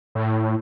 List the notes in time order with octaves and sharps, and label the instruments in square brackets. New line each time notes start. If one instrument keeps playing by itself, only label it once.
[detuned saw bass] A2